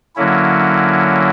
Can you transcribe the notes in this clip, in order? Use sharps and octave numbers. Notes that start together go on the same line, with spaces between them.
D3 F#3 A#3 C#4 E4